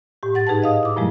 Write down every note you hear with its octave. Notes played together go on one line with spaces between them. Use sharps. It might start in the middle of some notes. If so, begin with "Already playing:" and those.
A2 G4
G#2 F#5 A6
D#4 G#4 B4 F#5 A5
D#5 F5 D#6
E4 D6
G2 A#2 F3 F#3 G#3 A3